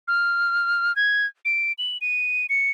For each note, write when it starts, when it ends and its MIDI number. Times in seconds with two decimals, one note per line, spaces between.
0.08 0.95 89
0.96 1.26 92
1.45 1.73 98
1.78 1.98 102
2.01 2.46 99
2.49 2.71 97